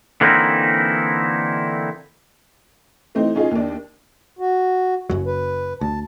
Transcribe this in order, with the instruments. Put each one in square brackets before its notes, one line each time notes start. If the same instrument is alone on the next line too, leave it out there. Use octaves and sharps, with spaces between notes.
[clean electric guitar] D3 E3 A#3 C4 D#4 E4
[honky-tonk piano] E3 A3 C4 D#4
C#4 D#4 F4 G#4
D#2 D4
[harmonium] F#4
[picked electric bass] F#1 F#2 F#3
[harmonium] B4
[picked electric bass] D2 [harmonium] A5